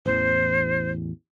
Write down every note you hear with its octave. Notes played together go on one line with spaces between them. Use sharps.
A1 E2 C5